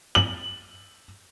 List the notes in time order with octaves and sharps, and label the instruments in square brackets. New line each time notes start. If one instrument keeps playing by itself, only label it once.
[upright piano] F#7